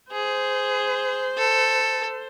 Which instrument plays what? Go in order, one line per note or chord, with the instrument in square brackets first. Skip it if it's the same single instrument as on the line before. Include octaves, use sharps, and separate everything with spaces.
[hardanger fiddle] G#4 [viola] C5
[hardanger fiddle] A4